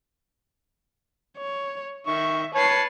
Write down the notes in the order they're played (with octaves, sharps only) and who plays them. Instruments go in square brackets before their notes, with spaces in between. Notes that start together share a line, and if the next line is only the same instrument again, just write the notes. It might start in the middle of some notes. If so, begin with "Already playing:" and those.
[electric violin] C#5
[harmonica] D#3 C#6 [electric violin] E5
[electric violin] B4 C7 [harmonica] C#5 A5